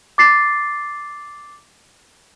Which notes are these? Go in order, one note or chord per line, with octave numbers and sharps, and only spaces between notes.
D6 A6 C7